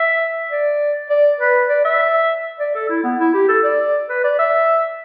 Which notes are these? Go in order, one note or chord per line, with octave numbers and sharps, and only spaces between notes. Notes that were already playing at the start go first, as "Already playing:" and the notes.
Already playing: E5
D5
D5
B4
D5
E5
D5
A4
E4
B3
E4
G4
A4
D5
B4
D5
E5